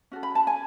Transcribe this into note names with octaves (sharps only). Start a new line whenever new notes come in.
C#4 F#4 A4
B5
A5
G#5